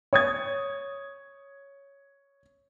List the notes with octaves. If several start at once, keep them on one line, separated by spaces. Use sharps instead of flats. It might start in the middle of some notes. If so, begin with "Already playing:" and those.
C#5 D#6 G#6